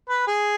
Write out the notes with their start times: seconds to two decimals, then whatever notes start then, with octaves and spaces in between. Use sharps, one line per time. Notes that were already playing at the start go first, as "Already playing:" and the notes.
0.09 B4
0.28 G#4